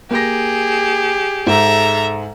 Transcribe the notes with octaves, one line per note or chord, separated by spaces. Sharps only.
A#3 G4 G#4 A#6
G#2 A4 E5 A#5